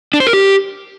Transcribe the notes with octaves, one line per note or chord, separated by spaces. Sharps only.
D4
C5
A#4
G4